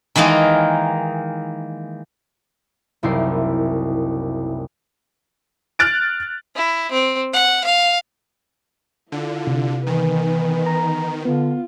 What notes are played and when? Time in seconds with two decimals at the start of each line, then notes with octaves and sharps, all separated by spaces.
0.15 D#3 E3 G#3 A#3 D#4
3.03 F#1 C2 D#4 E4 A#4 C7
5.79 F6 F#6 A6 D7
6.56 E4
6.92 C4
7.33 F#5
7.64 F5
9.12 D3 E4 F4
9.47 C3
9.87 D#3 E3 B3 B4
10.66 A#5
11.25 D3 B3 F4